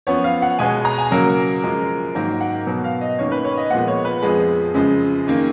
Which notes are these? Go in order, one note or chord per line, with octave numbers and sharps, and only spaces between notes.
F#2 F3 B3 C#5
F5
F#5
B2 G#3 B3 G#5
A#5
G#5
C#3 F#3 A#3 A#4
F#2 F3 G#3
G#2 D#3 F#3 A#3 A#4
F#5
B2 F#3 B3
F5
D#5
F#2 D#3 A#3 C#5
B4
C#5
D#5
A#2 F3 G#3 B3 F#5
C#5
B4
F2 F3 G#3 B3 G#4
F#2 C#3 F3 G#3
F#2 D#3 A#3